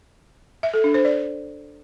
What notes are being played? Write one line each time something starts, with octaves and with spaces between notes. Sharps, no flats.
E5
A4
D4
C5
D5